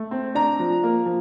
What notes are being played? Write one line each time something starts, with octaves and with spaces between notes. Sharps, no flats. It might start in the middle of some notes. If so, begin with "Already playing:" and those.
Already playing: A3
C4
D4 A#5
F3
A#3
F3